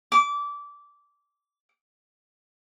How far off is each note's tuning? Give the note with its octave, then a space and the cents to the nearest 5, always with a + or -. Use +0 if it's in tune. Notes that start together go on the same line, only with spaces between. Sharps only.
D6 -20